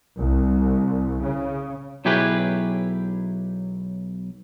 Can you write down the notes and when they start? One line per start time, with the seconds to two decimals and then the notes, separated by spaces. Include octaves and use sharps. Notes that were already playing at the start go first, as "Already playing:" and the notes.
0.19 C2
1.24 C#3
2.05 B1 F#3 E4 G4 G#4 B4